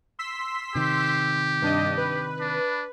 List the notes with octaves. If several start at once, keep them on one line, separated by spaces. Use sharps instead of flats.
C6 E6 B6
C3 D#3 G4
G2 D4 D#5
B4
D4